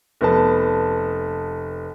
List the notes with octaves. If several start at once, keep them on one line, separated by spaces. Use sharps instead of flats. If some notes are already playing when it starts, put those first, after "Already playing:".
F1 B3 A5